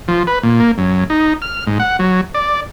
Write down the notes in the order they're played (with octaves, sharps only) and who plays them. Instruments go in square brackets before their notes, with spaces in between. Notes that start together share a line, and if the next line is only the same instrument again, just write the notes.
[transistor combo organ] F3
B4
A#2
A#3
F#2
D#4
F6
G#2
F#5
F#3
D5